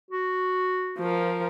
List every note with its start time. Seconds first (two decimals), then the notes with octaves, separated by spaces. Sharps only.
0.11 F#4
0.99 F3 A#4